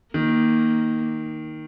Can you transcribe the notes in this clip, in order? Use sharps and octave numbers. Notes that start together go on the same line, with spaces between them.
D#3 A#3